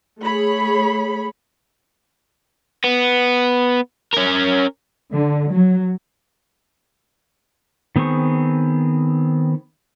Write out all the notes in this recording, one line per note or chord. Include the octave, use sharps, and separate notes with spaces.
A3 G#4 C#5 B5
B3
C#4 A#4
D3
F#3
D#3 B3 C4 G#4 C#6